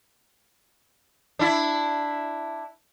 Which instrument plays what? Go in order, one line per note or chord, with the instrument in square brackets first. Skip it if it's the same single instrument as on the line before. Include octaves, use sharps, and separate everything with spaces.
[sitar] D4 E4